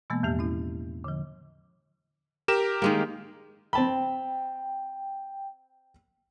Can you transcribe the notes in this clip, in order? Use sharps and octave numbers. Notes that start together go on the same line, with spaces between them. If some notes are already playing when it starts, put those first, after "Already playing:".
B2 E3 G#3 A#3 B3
E2 A2 F3 G4
C#4 E4
D3 F3
G4 A#4 E7
D#3 G#3 A#3
C4 G5 A5 B5